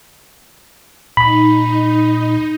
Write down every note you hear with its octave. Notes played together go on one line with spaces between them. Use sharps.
A#2 D#4 B5